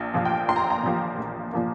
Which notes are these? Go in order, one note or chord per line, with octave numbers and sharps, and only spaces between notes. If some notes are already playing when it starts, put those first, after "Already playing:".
Already playing: A#1
A#2 F3 A#3
G5
A#1 C6
A#5
G5
A#5
A#2 F3 A#3
A#1
A#2 F3 A#3